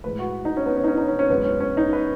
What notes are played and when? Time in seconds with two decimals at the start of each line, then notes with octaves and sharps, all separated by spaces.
0.04 A2 E3 G#3 B4
0.19 F#4
0.45 D#4
0.57 C#4
0.66 B3
0.77 C#4
0.84 D#4
0.88 C#4
0.98 D#4
1.08 C#4
1.19 C#4
1.29 F#2 E3 G#3 B3
1.45 C#4
1.60 C#4
1.77 D#4
1.93 B4